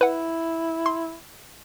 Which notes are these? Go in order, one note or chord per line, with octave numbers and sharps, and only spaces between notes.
E4 B4 F#5
C6